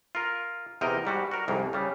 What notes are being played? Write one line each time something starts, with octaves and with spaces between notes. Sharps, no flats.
F4 A#4
E2 C3 A#4 D#5 G5
G#2 G3 F#4
F#4 A#4
C2 F2 G#2
C#3 G3